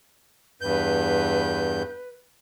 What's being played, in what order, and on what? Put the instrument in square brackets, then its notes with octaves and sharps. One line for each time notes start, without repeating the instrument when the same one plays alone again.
[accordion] E2 G2 G6 [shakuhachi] B4